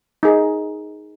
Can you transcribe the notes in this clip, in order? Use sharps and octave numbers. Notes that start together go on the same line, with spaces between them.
D#4 G#4